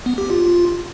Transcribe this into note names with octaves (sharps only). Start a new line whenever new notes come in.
B3
G4
F4